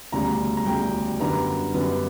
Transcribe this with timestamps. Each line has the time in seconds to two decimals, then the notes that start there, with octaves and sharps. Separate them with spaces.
0.12 E1 D2 C#3 G3 A#5
0.57 A#5
0.66 E1 D2 C#3 G3 G5
1.20 F#2 D3 G3 B3 A#5
1.74 F#2 D3 G3 B3